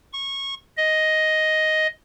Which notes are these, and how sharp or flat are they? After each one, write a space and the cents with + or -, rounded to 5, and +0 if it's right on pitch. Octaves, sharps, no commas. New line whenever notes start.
C#6 -20
D#5 +5